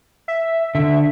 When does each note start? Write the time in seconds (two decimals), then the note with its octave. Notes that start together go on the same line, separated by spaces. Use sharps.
0.28 E5
0.75 D3 E5